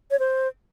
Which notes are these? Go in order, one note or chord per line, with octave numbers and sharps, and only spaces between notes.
C#5
C5